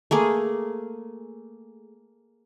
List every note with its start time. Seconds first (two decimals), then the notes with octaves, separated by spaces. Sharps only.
0.11 A3 A#3 G#4